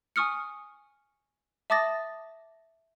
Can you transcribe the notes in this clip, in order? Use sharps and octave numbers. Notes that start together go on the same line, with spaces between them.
G#5 C#6 D#6 F6 C#7
E5 A5 D6 D#6 A6 A#6